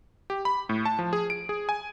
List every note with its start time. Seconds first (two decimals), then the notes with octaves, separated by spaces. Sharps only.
0.30 G4
0.45 B5
0.69 A2
0.86 A5
0.99 F3
1.13 G#4
1.30 D7
1.49 G#4
1.69 G#5